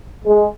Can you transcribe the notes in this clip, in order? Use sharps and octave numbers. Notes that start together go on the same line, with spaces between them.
G#3